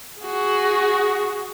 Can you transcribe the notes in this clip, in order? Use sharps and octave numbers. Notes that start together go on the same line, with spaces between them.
F#4 G#4